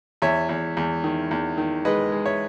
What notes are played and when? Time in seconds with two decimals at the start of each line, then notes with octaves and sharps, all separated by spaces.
0.22 E2 C#5 E5
0.49 E2
0.77 E2
1.04 D#3
1.31 E2
1.58 D#3
1.85 G#3 B4 D#5
2.12 G#3
2.25 C#5 E5